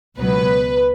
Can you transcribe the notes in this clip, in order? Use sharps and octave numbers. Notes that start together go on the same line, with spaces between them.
C#2 B2 F#3 B3 B4